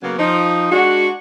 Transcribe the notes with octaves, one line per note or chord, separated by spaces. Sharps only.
C#3 F#3 A#3 B3 C#4
F3 D#4
G#3 D4 F#4